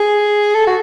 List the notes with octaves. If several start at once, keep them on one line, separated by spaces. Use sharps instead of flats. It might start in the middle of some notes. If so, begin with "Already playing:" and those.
Already playing: G#4
A4
F#4